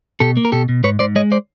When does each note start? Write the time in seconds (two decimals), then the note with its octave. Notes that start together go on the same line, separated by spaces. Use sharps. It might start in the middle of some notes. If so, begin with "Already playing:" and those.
0.20 B2 G4 A4
0.37 A#3
0.45 A#4
0.52 B2 G4 A4
0.69 B2
0.84 G#2 B4 C#5
0.99 G#2 C5 D5
1.16 G#3 C#5 D#5
1.32 C5 D5